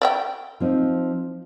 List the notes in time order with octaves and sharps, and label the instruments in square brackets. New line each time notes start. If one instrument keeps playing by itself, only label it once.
[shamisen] D5 E5 G5
[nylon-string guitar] F3 C4 D#4